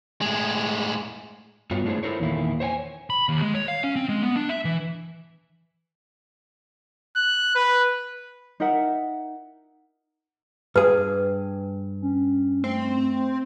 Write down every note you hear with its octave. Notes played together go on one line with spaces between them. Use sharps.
A2 G#3
G2 B3 F4 F#4 C#5
A3 D4 E4 G#4 C5 C#5
E4 F4 A4 A#4 C5 C#5
E2 A#2 D#3 A#3 E4
C5 C#5 F#5 G#5
B5
D#2
G#3
C#5
F5
C#4
C4
G#3
B3
D4
E5
E3
F#6
B4
D#4 A#4 E5 F#5
G2 G#4 B4
C#4
A3 C4